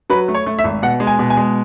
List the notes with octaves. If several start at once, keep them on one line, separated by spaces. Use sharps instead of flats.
F#3 B4
A3
C#5
A3
E5
G#1
B2 F#5
G#3
G#5
B2
G#5
G#3